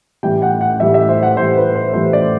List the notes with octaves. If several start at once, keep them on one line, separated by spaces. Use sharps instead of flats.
A2 E3 G3 G5
F#5
F#5
A2 E3 G3 E5
E5
C5
F#5
A2 E3 G3 C5
B4
C5
A2 E3 G3 C5
D5